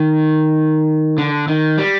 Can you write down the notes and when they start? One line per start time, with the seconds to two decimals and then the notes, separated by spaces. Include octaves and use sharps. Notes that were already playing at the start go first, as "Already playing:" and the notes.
Already playing: D#3
1.18 D3
1.48 D#3
1.78 G3